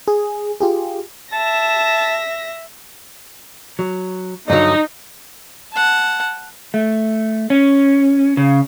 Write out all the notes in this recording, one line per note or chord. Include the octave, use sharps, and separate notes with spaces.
G#4
F4 G4 G#4
E5 A5 A#6
F#3
G2 D3 F#3 D#4
F#5 A5
A3
C#4
C#3